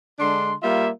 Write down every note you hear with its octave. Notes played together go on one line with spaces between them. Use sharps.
D3 G#3 D4 C6
G3 A#3 F4 E5